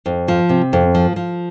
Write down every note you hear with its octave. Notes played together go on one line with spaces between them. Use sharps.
F2
F3
C3
F2
F3
F3